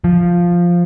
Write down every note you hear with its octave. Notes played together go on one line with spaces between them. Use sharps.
F3